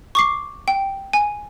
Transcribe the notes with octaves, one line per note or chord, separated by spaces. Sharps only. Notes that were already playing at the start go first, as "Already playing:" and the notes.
C#6 D6 C7
G5
G#5